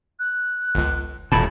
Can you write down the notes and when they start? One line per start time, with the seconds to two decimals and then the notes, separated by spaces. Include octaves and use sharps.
0.19 F#6
0.75 G1 C#2
1.32 D#1 A2 A5 B5